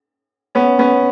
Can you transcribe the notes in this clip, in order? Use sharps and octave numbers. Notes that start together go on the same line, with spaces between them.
B3 C#4
B3 C#4